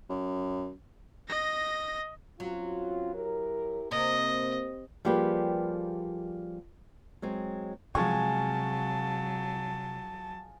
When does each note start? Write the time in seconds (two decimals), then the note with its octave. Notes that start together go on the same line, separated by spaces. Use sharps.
0.10 F#2
1.28 D#5 A#6
2.40 F#3 C4 C#4 F4
3.14 E4 G4 A#4
3.91 C3 A#3 D#5
5.05 F3 G3 A#3 G4 G#4 B4
7.22 F#3 G#3 C4
7.95 C3 F3 F#3 G#3 G#5 A5 C#6